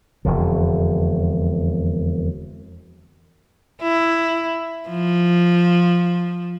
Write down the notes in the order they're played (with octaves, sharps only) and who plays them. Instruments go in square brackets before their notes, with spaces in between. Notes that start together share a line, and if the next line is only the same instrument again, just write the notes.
[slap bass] E1 F2 D3
[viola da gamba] E4
F3